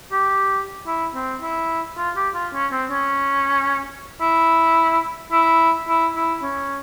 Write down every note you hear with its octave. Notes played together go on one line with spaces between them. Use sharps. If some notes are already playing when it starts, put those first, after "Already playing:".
G4
E4
C4
E4
F4
G4
F4
C#4
C4
C#4
E4
E4
E4
E4
C#4